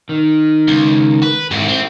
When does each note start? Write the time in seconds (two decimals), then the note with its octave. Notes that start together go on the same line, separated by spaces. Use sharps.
0.09 D#3
0.68 C#2
1.23 B4
1.51 G#2 D#3 E4 G4
1.68 C4